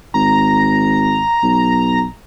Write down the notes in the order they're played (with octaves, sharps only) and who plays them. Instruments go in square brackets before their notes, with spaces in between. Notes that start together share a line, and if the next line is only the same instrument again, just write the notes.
[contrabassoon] G#1 [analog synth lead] A#5
[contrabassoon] B1